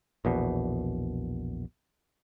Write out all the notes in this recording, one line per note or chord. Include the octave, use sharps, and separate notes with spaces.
A#1 E2 B2